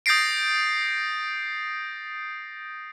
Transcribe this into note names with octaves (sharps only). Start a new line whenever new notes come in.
D#6 G6 A6 A#6 C7 D7